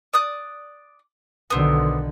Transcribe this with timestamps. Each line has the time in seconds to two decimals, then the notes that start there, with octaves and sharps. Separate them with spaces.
0.13 D5 D#6 F#6
1.50 B1 D3 D#3 B3 C4